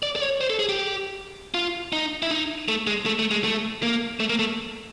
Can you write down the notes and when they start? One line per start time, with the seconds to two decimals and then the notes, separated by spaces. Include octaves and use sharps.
0.03 D5
0.16 D5
0.21 C#5
0.41 C5
0.50 A4
0.59 G#4
0.69 G4
1.54 F4
1.93 D#4
2.23 E4
2.31 D#4
2.68 A3
2.87 G#3
3.06 A3
3.19 A3
3.31 G#3
3.44 A3
3.83 A#3
4.20 A3
4.29 A#3
4.39 A3